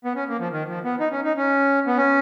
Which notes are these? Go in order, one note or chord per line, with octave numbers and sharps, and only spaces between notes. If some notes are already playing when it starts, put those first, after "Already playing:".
B3
C#4
A#3
F3
D#3
F3
B3
D#4
C#4
D#4
C#4
B3
C#4